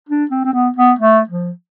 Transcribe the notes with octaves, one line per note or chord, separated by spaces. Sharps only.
D4
C4
C4
B3
B3
A3
F3